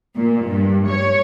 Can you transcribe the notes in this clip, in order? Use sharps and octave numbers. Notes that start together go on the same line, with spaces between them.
A#2
G2
C#5